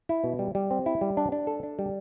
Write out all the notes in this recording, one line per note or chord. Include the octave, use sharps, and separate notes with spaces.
E4
B2
G3
G3
C4
E4
G3
D4
D4
A4
D4
G3